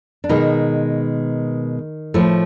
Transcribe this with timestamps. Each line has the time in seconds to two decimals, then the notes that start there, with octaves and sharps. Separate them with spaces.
0.24 D4
0.29 B2 D#3 G#3 D#4
2.14 A2 F3 A3